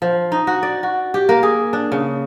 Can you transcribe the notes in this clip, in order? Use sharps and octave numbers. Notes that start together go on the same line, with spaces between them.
F3
D#4
F#4
D5
F#4
G4
A#3
G#4
D4
C#3